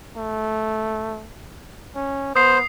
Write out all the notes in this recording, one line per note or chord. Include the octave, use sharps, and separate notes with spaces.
A3
C#4
B3 C5 D#6 C7